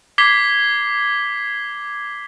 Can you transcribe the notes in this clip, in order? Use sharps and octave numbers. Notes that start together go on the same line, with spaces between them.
D6 G#6 B6 C7 G7